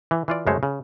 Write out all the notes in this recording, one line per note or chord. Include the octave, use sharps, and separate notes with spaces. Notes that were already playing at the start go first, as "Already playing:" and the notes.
E3
E3 F4 D5
F#2 C#3 G#3 A3 C5 C#5
C#3